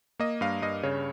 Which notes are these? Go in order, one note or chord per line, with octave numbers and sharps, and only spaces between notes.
A#3 D#5
G2 F5
G2 D#5
C#3 C#5